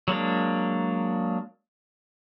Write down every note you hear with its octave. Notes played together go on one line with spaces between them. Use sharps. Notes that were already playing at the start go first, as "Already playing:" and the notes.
F#3 G#3 A#3 D4